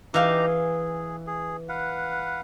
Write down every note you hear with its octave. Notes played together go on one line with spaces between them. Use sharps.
E3 D#4 G4 F5 A#5
G#4
G#4
B4 F5 F#5